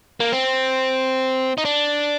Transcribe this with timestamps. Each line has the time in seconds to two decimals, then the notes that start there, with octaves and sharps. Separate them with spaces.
0.20 A#3
0.32 C4
1.58 D#4
1.65 D4